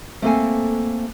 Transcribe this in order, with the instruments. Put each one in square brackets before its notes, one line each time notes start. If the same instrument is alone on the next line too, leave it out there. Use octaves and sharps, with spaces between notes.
[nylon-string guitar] A3 A#3 C4 A4 F5 G#5